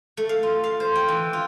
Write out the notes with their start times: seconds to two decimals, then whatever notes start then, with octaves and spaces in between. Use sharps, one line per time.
0.17 A3
0.29 F5
0.43 F4
0.64 F5
0.80 C5
0.95 G5
1.08 E3
1.33 F4